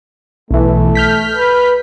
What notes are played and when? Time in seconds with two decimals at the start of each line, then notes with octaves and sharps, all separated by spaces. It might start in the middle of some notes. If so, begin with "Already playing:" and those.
0.51 B1 E3 A3
0.95 F6 G6 B6
1.37 B4